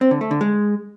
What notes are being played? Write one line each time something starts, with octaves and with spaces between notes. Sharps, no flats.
C4
D3
A3
D3
G#3